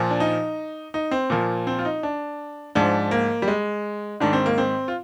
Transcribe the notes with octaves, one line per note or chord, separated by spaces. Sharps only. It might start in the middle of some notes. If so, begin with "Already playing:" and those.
Already playing: A#2 F3
D4
D#4
D#4
C4
A#2 F3 A#3
C4
F4
D#4
D4
G#2 F3 D4
A#3
G3
G#3
G#2 D#3 D4
C4
A#3
C4
F4